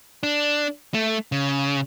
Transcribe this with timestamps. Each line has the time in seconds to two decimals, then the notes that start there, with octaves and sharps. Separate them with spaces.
0.23 D4
0.94 A3
1.32 C#3